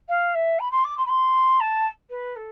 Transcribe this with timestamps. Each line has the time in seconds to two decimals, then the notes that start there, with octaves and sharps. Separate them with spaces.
0.09 F5
0.34 E5
0.59 B5
0.71 C6
0.84 D6
0.97 C6
1.06 B5
1.09 C6
1.60 A5
2.10 B4
2.36 A4